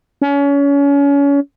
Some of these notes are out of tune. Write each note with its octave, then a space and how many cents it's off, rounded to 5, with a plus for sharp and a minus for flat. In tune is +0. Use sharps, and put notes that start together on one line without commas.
C#4 +30